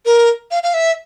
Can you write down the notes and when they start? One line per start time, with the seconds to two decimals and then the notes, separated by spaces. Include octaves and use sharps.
0.05 A#4
0.51 F5
0.63 F5
0.74 E5